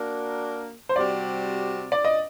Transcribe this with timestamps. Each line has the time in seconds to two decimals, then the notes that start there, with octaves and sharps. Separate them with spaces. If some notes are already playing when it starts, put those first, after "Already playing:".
Already playing: A#3 D4 F#4 A#4
0.89 C5
0.96 C3 G3 C4 F#4 D5
1.92 D5
2.05 D#5